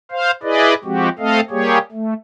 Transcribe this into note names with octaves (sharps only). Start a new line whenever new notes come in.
C5 F5
E4 G#4 B4 D5 D#5
F3 G#3 C4 F#4 G4
A3 C4 A4 D#5 F5
G3 A#3 G4 G#4 C#5
A3